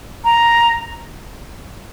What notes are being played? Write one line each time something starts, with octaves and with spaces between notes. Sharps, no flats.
A#5